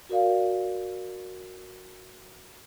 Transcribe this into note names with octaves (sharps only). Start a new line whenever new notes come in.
F#4 A#4 D5 F5